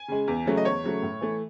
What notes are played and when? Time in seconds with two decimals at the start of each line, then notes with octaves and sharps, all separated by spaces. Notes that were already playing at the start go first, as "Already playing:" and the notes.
Already playing: G#5
0.08 C#3 G#3
0.28 E2
0.46 C#3 F#3 A3
0.57 D#5
0.65 E2 C#5
0.83 C#3 F#3 A3
1.03 A2
1.21 E3 A3